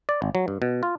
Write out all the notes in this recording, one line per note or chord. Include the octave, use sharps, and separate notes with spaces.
D5
G#1
F#3
G2
B2
F4